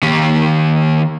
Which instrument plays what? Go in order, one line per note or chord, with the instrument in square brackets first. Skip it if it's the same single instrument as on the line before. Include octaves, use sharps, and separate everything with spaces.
[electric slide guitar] D#3 A#3 G4